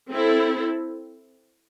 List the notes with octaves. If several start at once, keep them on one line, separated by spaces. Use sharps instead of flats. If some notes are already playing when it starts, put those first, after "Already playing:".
C4 E4 A4